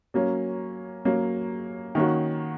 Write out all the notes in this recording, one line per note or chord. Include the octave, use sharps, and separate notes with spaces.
F#3 A#3 C#4
F#3 A#3 C#4
D#3 A#3 C#4 F#4